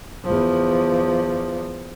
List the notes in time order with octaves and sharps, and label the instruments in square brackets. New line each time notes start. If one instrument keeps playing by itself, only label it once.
[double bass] E2 F3